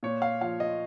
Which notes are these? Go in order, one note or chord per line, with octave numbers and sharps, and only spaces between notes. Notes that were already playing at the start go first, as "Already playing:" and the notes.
A#2 C#5
F5
F3 F5
D#5